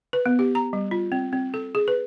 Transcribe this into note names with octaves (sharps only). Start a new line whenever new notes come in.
B4
B3
G4
A#5
G3
F4
C4
C4
A4
G#4
B4